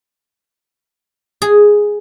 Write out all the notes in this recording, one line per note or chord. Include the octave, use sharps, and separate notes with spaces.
G#4